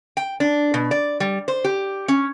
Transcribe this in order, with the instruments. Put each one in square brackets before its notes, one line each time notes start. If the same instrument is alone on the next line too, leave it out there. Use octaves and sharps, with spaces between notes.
[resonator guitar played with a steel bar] G5
D4
B2
D5
G3
C5
G4
C#4